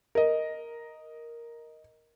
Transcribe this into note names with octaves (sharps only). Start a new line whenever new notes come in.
A#4 D#5